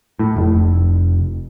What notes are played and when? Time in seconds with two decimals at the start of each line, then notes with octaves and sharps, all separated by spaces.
0.19 A2
0.37 F1